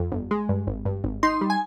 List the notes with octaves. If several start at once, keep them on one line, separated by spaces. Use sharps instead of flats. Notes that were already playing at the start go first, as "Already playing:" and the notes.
Already playing: F2
G1
G#3
G2
G#1
G2
G#1
D#4 C6
G3
G#5